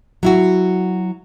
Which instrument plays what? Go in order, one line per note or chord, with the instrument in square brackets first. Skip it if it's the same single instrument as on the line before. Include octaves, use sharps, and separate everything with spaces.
[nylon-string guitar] F#3 E4 F#4